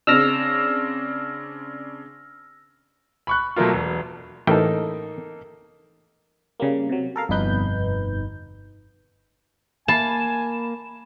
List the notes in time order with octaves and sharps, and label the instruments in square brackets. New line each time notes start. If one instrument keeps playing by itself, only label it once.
[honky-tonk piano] C#3 C4 D4 [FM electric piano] E6 F6 A#6
[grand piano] B5 C#6 F#6
B2 F#3 A3 A#3 F4
E1
[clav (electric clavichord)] A1 E3 G5 [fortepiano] A#3 D#4 A4
[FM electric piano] C#3 G3 A#3
C3 F#3
A4 A#4 F5
G1 F2 B2 D#4 B4 G6
[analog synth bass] A#3 [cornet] G#5 [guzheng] A5 [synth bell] B5 E7